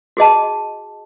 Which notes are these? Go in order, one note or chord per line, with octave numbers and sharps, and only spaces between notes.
F#4 G#4 D#5 A5